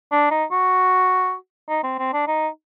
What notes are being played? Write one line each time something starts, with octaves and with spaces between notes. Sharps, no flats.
D4
D#4
F#4
D#4
C4
C4
D4
D#4